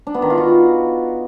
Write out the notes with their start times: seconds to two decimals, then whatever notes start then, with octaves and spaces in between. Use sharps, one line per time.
0.07 D4
0.14 B3
0.22 D#3
0.30 F4
0.38 F#4